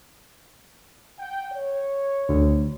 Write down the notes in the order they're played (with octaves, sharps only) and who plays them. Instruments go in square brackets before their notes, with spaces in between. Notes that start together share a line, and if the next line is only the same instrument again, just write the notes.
[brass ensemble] F#5 G5
C#5
[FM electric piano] D2